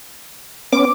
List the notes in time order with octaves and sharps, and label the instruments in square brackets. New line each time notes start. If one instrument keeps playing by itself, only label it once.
[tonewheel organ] B3 C#4 [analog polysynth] D6